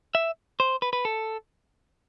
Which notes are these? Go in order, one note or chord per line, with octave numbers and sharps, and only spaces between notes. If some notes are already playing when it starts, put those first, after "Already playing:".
E5
C5
B4
B4
A4